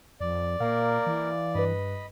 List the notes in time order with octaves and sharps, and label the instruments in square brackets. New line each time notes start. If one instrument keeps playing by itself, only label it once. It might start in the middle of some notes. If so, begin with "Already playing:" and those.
[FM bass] F2 [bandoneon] D5
[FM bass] A#2 [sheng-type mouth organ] A#3 A#4 [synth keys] F5
[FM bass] E3
[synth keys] G2 B4 [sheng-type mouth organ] D#5 B5